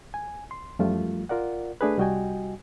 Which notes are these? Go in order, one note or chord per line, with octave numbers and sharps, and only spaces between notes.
G#5
C6
F#2 F3 G3 A3 F4
F4 A#4 D5 F#5
A3 D4 G#4 B4
C2 G3 F#4 D#5 G5 G#5